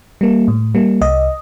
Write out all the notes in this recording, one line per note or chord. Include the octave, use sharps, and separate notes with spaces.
G3 A#3
A2
G3 A#3
C2 D#5